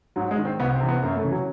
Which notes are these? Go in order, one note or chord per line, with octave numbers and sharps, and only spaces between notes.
G#2 F#3
G#3
D#3
C4
C2 B3
C4
C3 E3
B3
F#2 A#3
A3
C#3 E3
F#3